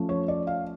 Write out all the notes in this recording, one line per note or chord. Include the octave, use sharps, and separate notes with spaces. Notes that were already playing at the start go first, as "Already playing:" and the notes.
Already playing: F3 A3 C#4
C#5
D5
F5